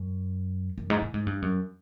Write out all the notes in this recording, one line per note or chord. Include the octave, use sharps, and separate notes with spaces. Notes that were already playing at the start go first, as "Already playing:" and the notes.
Already playing: F#2
F#2
G#2
A2
G#2
G2
F#2